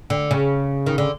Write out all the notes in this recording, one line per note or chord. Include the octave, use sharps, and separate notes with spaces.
D3
C#3
D#3
D3